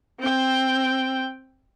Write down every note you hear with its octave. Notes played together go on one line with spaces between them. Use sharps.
C4 G5